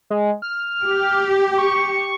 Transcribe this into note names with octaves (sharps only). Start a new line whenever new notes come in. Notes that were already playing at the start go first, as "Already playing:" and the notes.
G#3
F6
G4
C#6